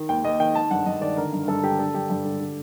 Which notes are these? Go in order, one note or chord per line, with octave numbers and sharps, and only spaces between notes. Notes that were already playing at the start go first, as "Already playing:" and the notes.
Already playing: D#3
D#2 G5
D#2 D#5
D#3 G5
D#3 A5
G2 F#5
G2 D#5
D#3 D5
D3 A#4
G2
G2 A4
D3 G4
D3 A4
G2 G4
G2
D3
D3